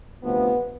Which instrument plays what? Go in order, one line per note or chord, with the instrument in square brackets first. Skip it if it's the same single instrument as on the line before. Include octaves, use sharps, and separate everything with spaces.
[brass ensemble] D2 C3 F3 B3